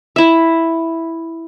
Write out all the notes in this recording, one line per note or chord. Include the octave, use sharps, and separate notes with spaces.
E4 E5